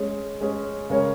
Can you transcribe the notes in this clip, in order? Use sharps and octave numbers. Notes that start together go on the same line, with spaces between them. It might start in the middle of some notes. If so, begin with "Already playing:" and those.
Already playing: G#3 C#4 G#4 C#5
G#3 C#4 G#4 C#5
C#3 G#3 C#4 A#4 C#5